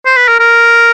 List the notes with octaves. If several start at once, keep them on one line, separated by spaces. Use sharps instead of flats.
C5
B4
A#4
A#4